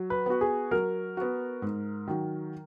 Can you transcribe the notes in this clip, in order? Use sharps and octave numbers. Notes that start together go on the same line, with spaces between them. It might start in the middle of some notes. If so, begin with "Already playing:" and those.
Already playing: F#3
B4
B3 F#4
G#4
F#3 A#4
B3 F#4
G#2
D#3 F#3